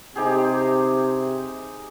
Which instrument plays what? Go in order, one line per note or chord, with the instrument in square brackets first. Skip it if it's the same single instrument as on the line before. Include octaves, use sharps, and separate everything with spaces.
[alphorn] C3 [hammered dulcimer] D#4 G4 G#4